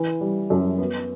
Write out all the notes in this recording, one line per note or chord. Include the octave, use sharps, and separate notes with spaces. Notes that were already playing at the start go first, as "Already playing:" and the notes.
Already playing: E3
G3
F#2
B3